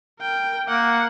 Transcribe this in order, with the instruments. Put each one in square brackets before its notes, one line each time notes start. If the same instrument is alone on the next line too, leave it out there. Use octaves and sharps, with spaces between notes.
[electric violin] A#4 G5
[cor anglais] A#3 [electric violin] F#5